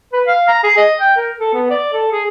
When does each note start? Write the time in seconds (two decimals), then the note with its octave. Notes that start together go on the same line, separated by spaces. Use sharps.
0.13 B4
0.28 F5
0.48 A#5
0.64 G#4
0.77 D#5
1.00 G5
1.17 A#4
1.40 A4
1.53 B3
1.70 D5
1.93 A4
2.12 G#4